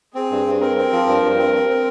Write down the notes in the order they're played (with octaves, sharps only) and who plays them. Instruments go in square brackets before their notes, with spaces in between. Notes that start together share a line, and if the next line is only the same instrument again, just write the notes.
[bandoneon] C4 [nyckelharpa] G#4
[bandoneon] G2
G2
[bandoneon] C4 [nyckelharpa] A#4
[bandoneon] C4
F3
[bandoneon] G2 [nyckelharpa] A#4
[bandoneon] G2
C4
C4
C4